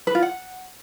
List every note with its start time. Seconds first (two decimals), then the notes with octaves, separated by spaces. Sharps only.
0.07 B4
0.15 F4
0.22 F#5